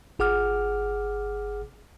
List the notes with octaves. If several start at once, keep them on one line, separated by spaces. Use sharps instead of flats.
G1 G#4 F#5 D6 F6